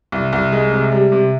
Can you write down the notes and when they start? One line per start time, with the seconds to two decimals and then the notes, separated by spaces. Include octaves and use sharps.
0.12 C2
0.33 C2
0.52 G#3
0.73 C3
0.92 G3
1.12 C3